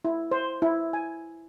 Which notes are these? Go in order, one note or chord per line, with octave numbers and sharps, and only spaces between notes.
E4
C5
E4
G#5